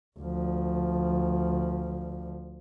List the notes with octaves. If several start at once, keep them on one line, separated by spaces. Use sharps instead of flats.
D2 F3